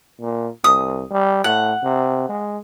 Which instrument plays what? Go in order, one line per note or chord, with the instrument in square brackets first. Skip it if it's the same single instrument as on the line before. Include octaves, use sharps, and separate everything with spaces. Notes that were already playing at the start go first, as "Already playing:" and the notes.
[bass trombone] A#2
[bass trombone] C2 [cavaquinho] D#6
[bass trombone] G3
[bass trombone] A2 [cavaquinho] F#5
[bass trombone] C3
G#3